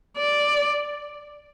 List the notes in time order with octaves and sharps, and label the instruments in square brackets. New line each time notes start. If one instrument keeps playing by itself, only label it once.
[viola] D5